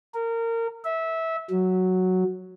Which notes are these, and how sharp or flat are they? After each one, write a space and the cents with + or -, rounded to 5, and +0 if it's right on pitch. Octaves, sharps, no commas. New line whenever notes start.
A#4 -25
E5 -20
F#3 +0